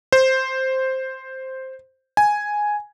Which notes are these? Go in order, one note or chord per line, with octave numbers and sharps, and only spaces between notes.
C5
G#5